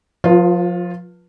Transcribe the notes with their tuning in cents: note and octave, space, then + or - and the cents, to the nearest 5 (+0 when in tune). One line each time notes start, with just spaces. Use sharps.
F3 +35 F4 +0 B4 -20